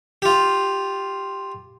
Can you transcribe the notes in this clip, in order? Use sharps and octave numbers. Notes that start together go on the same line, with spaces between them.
F4 G4